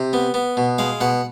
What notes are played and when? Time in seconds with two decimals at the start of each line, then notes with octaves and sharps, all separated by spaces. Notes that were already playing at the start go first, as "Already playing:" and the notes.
Already playing: C3
0.13 B3
0.34 B3
0.57 B2
0.78 G#3 F5
1.01 B2 F#5